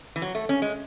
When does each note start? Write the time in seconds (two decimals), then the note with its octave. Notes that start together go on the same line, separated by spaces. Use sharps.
0.16 E3
0.22 F#3
0.35 A3
0.49 C#4
0.62 G#3